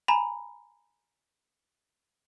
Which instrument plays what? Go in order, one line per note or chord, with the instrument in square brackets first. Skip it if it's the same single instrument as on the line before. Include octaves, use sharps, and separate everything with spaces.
[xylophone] G#5 A#5 B5